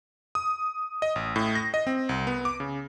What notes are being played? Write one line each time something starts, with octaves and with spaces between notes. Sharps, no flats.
D#6
D#5
A1
A2
A#6
D#5
C4
C2
B3
D6
C#3